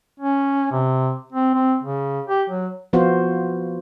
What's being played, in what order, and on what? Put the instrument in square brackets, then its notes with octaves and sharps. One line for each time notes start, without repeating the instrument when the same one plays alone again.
[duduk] C#4
C3
C4
C4
C#3
G4
F#3
[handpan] F3 B3 F4 F#4 C5